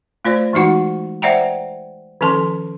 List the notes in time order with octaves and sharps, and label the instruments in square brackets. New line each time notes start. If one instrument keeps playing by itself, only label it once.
[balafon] A3 F4 C5 D5
E3 G#3 D#4 F#4 F#5
C5 D5 E5 F#5 G5 A#5
D#3 F3 C#4 A4 A5 C6